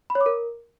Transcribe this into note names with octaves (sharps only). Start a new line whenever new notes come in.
B5
C#5
D6
A#4